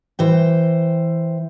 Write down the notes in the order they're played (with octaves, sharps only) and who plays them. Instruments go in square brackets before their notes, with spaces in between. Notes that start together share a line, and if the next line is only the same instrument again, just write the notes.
[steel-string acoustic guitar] E3 C5 G5